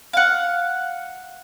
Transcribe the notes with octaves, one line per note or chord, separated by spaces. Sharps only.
F5 F#5